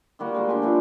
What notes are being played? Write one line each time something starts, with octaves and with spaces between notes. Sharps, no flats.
D#3 G3 A#3 F#4
G#3 A#3
D4 G4 G5 G#5
F3 F#3 A3 B3